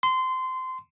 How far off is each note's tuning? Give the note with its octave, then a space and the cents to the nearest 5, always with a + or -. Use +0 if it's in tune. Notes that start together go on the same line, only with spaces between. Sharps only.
C6 -20